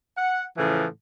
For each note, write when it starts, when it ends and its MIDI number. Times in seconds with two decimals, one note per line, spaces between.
0.17 0.42 78
0.57 0.85 45
0.57 0.85 49
0.57 0.85 52
0.57 0.85 53